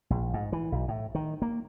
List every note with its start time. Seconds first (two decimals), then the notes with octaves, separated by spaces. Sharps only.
0.10 A#1
0.34 G#2
0.52 E3
0.72 B1
0.88 A2
1.15 D#3
1.42 A#3